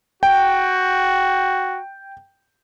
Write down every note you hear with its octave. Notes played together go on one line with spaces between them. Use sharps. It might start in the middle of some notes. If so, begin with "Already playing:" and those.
F#4 G5